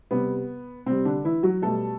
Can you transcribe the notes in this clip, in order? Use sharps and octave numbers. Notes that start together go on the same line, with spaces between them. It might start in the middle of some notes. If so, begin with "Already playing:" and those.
C3 G3 B3
C3 G3 C4
D3 D4
E3 E4
F#3 F#4
B2 G3 A3 A4